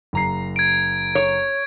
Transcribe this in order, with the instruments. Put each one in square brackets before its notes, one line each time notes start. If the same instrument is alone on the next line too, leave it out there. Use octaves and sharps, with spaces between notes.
[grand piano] F#1 A#5 C7
[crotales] G#6 D7
[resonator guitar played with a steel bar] C#5